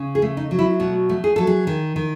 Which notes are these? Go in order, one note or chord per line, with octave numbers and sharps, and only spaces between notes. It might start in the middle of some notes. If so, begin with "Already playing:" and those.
Already playing: C#3
G#4
A3
D#4
F#3
E4
B2 F#4
A3
G#4
F#3 A4
G#4
D#3
D#3